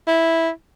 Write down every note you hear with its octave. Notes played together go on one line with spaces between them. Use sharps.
E4